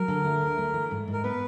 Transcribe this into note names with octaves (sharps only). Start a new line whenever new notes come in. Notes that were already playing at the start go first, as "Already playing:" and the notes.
Already playing: F#3 A#4
D3
A3
D2
A3
E3
G#2
G#2
A#4
B3 B4